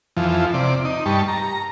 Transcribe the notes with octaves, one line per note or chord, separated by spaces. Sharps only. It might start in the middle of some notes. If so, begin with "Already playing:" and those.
F2 E3 F3
C3 D5
D#4
G2 G3 A5 C#6
A#5